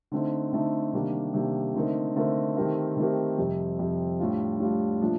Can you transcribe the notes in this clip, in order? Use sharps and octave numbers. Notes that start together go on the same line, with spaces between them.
D3 A3 C4 D#4
D3 A3 C4 D#4
C3 D#3 G3 A#3 D4
C3 D#3 G3 A#3 D4
D3 A3 C4 D#4 A#4
D3 A3 C4 D#4 A#4
D#3 A3 C4 G4 A#4
D#3 A3 C4 G4 A#4
F2 C3 G3
F2 C3 G3
A2 G3 D4 F4
A2 G3 D4 F4
A#2 F3 A3 D4